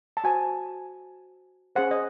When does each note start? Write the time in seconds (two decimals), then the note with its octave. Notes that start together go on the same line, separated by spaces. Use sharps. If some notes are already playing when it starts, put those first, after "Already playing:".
0.17 A5
0.24 F#4 C5 G#5
1.76 C#4 G#4 C5 F#5
1.91 D#5